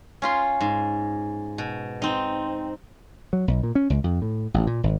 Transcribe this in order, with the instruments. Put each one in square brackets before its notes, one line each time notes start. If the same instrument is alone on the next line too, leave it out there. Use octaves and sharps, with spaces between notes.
[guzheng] C#4 F4 C6
G#2
B2
C4 D#4
[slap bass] F#3
B1
A#2
C#4
C#2
F2
A2
A1
A#2
G#1